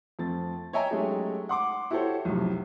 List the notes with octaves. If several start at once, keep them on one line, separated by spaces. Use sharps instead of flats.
F2 A3 C4 A6
C#5 D#5 E5 G5 G#5 A#5
F#3 G#3 A3 C#4 D#4 G4
F#5 C6 D6
E4 F#4 G4 A4 C5 C#5
B1 F2 A2 C3